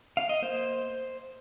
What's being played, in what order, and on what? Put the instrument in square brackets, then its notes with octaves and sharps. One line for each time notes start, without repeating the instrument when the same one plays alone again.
[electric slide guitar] F5
D#5
A#3 C5